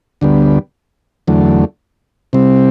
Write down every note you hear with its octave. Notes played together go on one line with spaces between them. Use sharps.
D2 D3 G3 B3
E2 D3 F#3 A3
C3 G3 C4